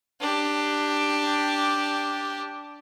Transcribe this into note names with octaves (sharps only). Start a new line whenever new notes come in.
D4 G4